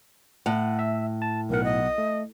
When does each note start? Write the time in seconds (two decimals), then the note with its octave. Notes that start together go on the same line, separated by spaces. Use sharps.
0.46 A2 F#5
0.79 E5
1.22 A5
1.50 B1 B3 A#4 F#5
1.64 D#5
1.98 A3